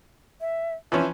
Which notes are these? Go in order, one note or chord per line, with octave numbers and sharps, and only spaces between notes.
E5
E3 F3 C#4 E5